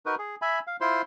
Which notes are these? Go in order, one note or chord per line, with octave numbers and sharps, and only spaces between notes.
D#4 F#4 A#4 B4
G#4
E5 G#5 B5
F5
E4 F4 C5 C6